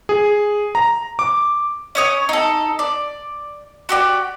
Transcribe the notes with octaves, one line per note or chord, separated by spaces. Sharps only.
G#4
A#5
D6
C#4 C#5 D#6
D#4 A4
D5
F#4 G4 D5